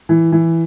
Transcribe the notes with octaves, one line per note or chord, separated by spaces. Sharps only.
E3
E3